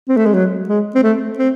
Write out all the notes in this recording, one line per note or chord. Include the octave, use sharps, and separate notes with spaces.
C4
A3
G#3
F#3
G#3
C4
A3
C4